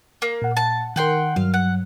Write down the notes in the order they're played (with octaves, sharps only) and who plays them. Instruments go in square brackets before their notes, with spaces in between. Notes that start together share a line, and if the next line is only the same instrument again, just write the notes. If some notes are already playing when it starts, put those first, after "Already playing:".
[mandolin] A#3
[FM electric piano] A#2 F#5
[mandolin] A5
[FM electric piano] D#3 A#4 [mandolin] F#5 G5 C6
[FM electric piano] G2 F#3 [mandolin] F5
[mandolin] F#5